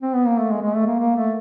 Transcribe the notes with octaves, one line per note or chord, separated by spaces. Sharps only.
C4
B3
A#3
A3
G#3
G#3
A3
A#3
A#3
A3